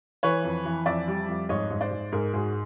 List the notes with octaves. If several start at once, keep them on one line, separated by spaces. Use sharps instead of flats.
E3 B4 C#5
F2
E3
F2 D5 E5
G3
F2
G#2 C#5 D#5
G#2
C5 D5
G#2
G#2 G#4 A#4
G#2 F#4 G#4